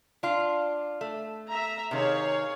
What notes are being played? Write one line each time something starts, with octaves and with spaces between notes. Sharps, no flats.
D4 F4
A3
E5 A#5
C3 D#3 G#4 C#5 F5